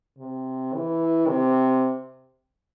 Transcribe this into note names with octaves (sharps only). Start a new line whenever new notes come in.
C3
E3
C3